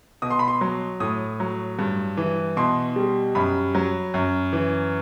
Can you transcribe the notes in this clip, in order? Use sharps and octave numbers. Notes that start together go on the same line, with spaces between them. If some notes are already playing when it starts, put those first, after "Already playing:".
B2 D#6
C6
B5
C6
F#3
A2 D#6
F#3
G2
E3
B2 C6
G3
F#2 B5
F#3
F#2
E3